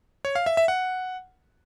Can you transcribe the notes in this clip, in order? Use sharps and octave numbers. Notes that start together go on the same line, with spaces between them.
C#5
F5
E5
E5
F#5